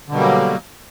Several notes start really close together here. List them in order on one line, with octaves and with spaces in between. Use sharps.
D3 B2 G3 A#3 F#3